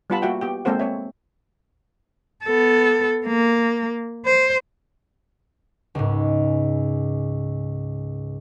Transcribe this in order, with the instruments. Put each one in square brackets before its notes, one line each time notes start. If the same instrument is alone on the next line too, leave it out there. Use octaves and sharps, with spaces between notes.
[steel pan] G3 B3 F4 F#5 A5 B5
A#3 F#4 E5 F#5 G5
B3 G4 G5
G#3 A#3 C4 A4 C5 F#5
C4 C#5 E5
[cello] B3 A4
A#3
C5
[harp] C#2 G#2